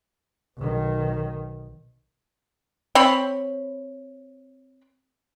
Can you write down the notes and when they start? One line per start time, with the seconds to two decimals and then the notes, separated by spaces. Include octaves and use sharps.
0.57 B1 D#3
2.95 C4 C#5 B5